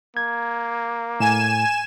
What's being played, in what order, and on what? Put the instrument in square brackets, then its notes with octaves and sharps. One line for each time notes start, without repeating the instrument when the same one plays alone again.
[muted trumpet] A#3 [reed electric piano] G#6
[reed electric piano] A2 [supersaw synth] G#5 E7